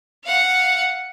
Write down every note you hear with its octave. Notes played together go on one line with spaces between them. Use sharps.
F5 F#5